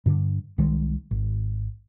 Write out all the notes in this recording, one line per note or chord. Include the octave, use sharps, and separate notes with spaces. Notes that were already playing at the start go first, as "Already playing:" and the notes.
G2 D3
C2 D#3 G#3
G#1